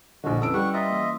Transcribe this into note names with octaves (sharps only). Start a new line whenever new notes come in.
A#1 D3 F#4 D#5
F2 C#4 E4 B4 E6 D7
G3 F#5 C#6
F4 C5 D#5 E5 A#5 A6
E3 A#3